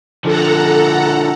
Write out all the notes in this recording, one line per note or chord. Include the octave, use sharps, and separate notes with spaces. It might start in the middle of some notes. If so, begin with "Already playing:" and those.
D3 F3 A4 F#5 A#5